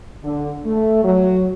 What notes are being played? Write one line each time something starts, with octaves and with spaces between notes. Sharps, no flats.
D3
A3
F#3